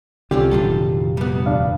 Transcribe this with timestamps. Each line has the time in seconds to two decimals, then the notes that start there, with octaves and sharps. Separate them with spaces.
0.31 C2 D3 C4 C#4 F4 G4
0.51 F1 A#2 D#3 F#3 F4 A4
1.17 G3 B3
1.46 D#2 D4 F5